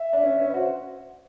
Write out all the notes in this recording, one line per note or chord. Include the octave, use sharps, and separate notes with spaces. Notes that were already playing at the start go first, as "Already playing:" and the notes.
Already playing: E5
D4
C#4
C#4
B4
F#4 C5